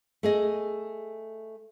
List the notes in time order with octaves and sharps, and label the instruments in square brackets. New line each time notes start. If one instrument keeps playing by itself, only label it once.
[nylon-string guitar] A3 G#4 D#5